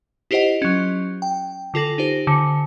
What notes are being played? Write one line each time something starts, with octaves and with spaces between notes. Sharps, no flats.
E4 F4 G4 C5 D#5 F#5
F#3 C#4
G5
D3 F4 A4 A#6 F#7
D#4 G4 C5
D3 C#7